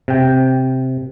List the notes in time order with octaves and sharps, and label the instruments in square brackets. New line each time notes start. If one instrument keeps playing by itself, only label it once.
[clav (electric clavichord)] C3 G5